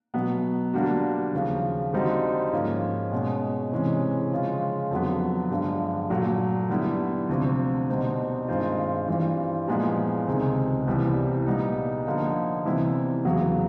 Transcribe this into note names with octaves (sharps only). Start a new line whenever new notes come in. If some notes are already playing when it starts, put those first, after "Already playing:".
B2 F#3 B3
D3 G3 A#3 D4 F#4
D#2 C#3 F3
D3 G3 C4 D#4 F#4
G#2 F3 A#3 C#4 F4
B2 G#3 C#4
C3 E3 G#3 C#4
C#3 F3 G#3 C#4 F4
F2 D3 F#3 B3
G2 D3 F3 G#3
A#2 F#3 A3
D3 G3 B3 E4
D2 C3 F3
B2 G3 C4 D#4
G2 D#3 G#3 C4 F4
G2 E3 G3 C4 F4
A#2 F3 G#3 B3 E4
C#2 C3 D#3 G#3
C2 C3 E3 G3 B3
A#2 G3 B3 D#4
D3 F3 A#3 D#4
C3 E3 G3 B3 E4
E2 C#3 F#3 B3